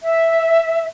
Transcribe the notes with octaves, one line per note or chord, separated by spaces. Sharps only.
E5